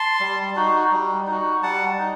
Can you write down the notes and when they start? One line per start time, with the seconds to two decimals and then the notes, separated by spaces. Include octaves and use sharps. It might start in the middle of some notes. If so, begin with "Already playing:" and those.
Already playing: A5 C6
0.20 G3
0.56 D#4 F#4
0.92 G3
1.27 D#4 F#4
1.63 G3 F#5 A5
1.99 D#4